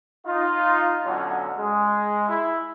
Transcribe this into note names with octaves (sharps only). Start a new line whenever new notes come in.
D#4 F4
B2 D3 F#3 C#4
G#3
E4